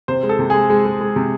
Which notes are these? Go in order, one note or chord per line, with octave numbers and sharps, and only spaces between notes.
C3 C5
G#3
A4
C3
G#3 G#4
G#3
G#3
G#3
C3